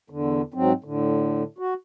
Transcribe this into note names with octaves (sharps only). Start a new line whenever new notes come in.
E2 D3
G#2 F#3 C4
A2 D3
F#4